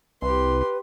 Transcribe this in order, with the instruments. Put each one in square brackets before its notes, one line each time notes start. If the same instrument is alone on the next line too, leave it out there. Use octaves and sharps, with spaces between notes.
[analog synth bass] C2 [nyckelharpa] G4 C6 [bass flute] B4